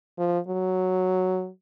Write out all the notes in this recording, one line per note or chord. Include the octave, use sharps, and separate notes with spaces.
F3
F#3